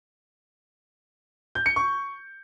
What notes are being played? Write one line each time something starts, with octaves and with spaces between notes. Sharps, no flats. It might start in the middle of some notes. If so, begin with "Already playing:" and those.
G6
C#7
C#6